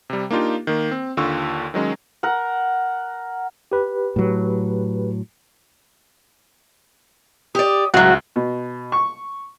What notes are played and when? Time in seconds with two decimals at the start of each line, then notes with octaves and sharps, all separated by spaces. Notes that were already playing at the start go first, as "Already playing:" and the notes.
0.10 C3 G3
0.31 A#3 D4 D#4 F4 G4
0.67 D#3 A#3
0.91 C4
1.17 D#2 D3 F4 C#6 E6
1.74 D#3 F#3 G#3 C#4
2.23 A#4 F#5
3.72 G4 B4
4.16 A2 F#3
7.55 G4 D5 D#6
7.94 C#2 A2 F#3 F#4 E5 F#6
8.36 B2
8.92 C#6